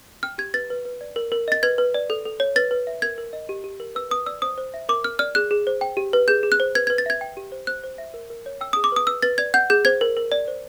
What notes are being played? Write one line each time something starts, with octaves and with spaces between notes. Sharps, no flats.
G5 F6
G4 G#6
B4 A6
B4
B4
D5
A#4
A#4
D#5 A6
B4 G#6
B4
D5
A4
A4
C#5
B4 A6
B4
E5
A#4 G#6
A#4
D#5
G4
G4
A#4
B4 E6
B4 D#6
D5 E6
C5 D#6
C5
E5
A#4 D6
A#4 F6
D5 F6
G#4 F#6
G#4
C5
G5
G4
B4
G#4 G6
G#4
F#6
C5
B4 G#6
G#6
B4
A6
E5 G#6
G5
G4
C5
C5 F#6
C5
E5
A#4
A#4
C#5
G5 E6
D#6
G#4
D6
B4 D#6
B4 E6
B4 A6
D5 G#6
F#5 G6
G#4 G6
C5 G#6
A#4
A#4
D5
C5